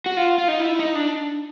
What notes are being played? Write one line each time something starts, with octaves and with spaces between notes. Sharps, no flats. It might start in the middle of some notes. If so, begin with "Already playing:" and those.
F#4
F4
F4
D#4
E4
D#4
D4